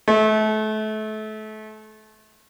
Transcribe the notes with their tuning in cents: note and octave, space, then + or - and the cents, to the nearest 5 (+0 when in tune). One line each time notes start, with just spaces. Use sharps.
A3 -30